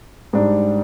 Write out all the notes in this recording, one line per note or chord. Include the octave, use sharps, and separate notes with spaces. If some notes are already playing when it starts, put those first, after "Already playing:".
G#2 G3 D4